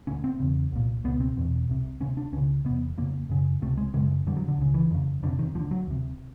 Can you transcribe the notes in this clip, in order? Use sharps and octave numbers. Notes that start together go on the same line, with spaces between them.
D2 D3 C#4
C4
E2 C#3
C2 A#2
C#2 B2 B3
C4
E2 B2
C2 C3
D2 C3 C#4
D4
C#2 C#3 C#4
E2 C3 B3
F2 C#3 A#3
F#2 C#3
C#2 C3 A3
G#3
F#2 C#3 G#3
F2 D3 G3
F#3
D3
C#2 C#3
E3
F2 C#3
F2 C3 D3
D#3
D2 D3 F3
F#3
D2 C3